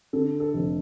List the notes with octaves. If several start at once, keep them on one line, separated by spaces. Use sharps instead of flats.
D3 A4
A4
F1